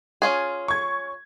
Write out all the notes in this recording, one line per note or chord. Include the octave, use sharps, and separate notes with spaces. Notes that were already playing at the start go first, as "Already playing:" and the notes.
C#4 F4 G#4
C#6 G#6